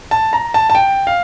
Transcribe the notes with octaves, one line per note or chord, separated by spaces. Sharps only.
A5
A#5
A5
A5
G5
F5